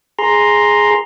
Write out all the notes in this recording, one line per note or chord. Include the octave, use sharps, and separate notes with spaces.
G#4 A#5 C6